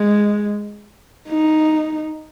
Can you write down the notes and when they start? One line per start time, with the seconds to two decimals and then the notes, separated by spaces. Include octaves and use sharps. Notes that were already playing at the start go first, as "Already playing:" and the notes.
Already playing: G#3
1.28 D#4